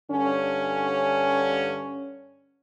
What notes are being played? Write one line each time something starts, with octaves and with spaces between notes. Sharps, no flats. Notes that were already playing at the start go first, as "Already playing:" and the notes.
G2 D3 C#4